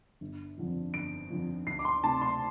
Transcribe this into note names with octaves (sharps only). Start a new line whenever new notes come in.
G1
F2 D3 F3
G1 D7
F2 D3 F3
D2 C7
D6
C6
C3 A3 A5
C6